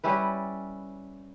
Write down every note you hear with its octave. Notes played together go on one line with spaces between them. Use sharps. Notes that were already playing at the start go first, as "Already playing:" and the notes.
G3 C#4 E4 B4